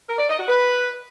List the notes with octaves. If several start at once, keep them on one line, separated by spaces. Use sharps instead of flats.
A#4
D5
D#5
F#4
B4